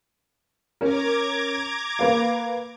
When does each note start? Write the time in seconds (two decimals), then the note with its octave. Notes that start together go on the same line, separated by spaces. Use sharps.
0.81 C#4 A#4 A#5 D6 G#6
1.99 A#3 B4 F5